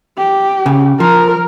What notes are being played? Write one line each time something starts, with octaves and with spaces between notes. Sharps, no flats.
G4
C#3
F3 A#4